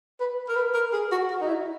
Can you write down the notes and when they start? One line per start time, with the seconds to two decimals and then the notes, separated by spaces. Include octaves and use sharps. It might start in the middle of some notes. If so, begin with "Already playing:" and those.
0.20 B4
0.49 A#4
0.55 B4
0.74 A#4
0.93 G#4
1.11 F#4
1.30 F#4
1.41 D#4
1.47 E4